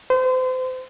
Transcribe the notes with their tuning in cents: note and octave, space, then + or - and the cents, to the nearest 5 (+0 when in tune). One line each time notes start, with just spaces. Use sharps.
C5 -35